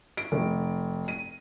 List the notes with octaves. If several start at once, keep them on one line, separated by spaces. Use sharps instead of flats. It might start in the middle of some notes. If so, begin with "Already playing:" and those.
D7
F1
D#7